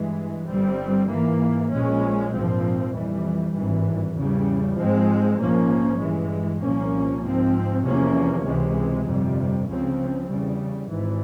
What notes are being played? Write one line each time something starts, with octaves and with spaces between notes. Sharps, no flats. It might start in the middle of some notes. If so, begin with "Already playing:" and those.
Already playing: G2 E3 G#3
G1 G2 G3 C4
G#2 E3 A#3
A#1 A#2 G#3 C#4
A#1 G#2 F3 C4
F2 E3 G3
G#1 G2 E3
E2 C#3 G3
G#2 F3 G#3 C4
A#1 G#2 F3 A#3 C#4
G2 E3 G#3
C2 A#2 F3 A#3 C#4
G#2 F3 C4
E2 C3 F3 A#3 C#4
C#2 C3 E3 G#3
G1 F2 C3 G3
C#2 C#3 F3 C4
E2 C#3 G3
G#1 G#2 E3